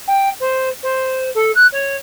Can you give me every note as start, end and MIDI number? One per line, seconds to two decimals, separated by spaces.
0.07 0.29 79
0.40 0.69 72
0.83 1.30 72
1.34 1.51 69
1.55 1.66 90
1.72 1.96 73